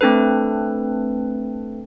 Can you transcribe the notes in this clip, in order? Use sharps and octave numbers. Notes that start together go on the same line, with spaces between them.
A3 C4 D4 A4 B4